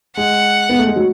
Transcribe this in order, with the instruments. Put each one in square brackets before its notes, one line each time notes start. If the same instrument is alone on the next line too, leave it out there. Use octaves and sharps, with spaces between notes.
[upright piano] G#3 [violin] F#5
[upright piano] B3
A3
G#3
F#3